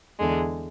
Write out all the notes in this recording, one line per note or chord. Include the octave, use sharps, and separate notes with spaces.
E2 D3 G#3